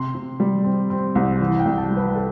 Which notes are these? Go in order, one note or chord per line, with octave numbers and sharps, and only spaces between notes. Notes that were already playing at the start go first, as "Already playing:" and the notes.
Already playing: C3 C6
C3
G3
C4
C4
C2
E3
G5
C2
A5
G3
B4
A4